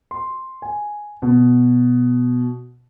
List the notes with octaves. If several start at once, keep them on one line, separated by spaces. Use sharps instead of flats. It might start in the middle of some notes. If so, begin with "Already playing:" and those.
C6
G#5
B2